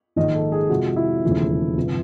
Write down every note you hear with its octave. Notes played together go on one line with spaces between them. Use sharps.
A#1 G#2 D#3 G#3 D#5
A4
G#4
F2 C3 F3 G#3 F#4
E4
E1 D#2 C#3 F3 A3
G1 C3 E3